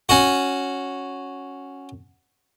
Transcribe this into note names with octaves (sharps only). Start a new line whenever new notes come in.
C#4 F#4